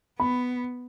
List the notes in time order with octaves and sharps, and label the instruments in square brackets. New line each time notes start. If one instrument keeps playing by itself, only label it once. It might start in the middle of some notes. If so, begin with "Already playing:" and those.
[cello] B3 [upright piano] B5